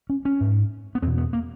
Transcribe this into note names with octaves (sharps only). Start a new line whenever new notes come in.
C#4
C#4
G#2
B3
E2 B2 C4
B3
A#3